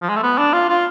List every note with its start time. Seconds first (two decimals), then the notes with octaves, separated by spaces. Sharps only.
0.02 F3
0.09 G#3
0.16 A3
0.23 B3
0.38 D4
0.53 F4
0.69 F4